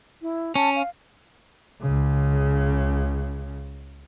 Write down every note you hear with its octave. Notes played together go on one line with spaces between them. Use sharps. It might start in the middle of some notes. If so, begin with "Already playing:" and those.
E4
C#4 A5
F5
C#2 C#3